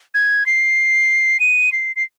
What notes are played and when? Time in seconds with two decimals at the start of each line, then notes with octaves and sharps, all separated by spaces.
0.14 G#6
0.46 C7
1.40 D#7
1.72 C7
1.96 C7